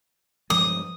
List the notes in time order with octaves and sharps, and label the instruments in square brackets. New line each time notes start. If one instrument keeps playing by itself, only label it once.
[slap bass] G2 F3 G#3 [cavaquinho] D#6